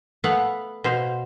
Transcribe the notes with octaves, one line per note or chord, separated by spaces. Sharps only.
A3 B3 F5 F#5
B2 C5 F5